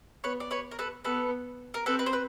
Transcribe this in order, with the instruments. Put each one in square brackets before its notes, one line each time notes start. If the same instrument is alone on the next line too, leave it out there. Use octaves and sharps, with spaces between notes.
[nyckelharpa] B3 [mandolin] B4 C#5
[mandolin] D5
B4 C#5
A#4
A4 B4
[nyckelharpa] B3 [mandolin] A4 B4
[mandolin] A#4
[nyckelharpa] C4 [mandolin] A4 B4
[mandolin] B4
C5
B4